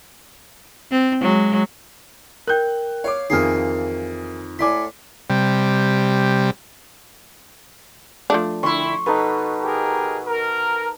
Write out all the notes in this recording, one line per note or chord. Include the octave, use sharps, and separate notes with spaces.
C4
F#3 G#3
A#4 G5 F#6 G6
C#5 F5 D6
F2 D#3 E3 A#3 G#4 F6 C7
A2 E4 D5 G#5 C6 D6 B6
C3 G3
F3 A3 D4
D3 E4 C6 C#6
B2 D#4 A4 B4
G4 G#4 A#4
A#4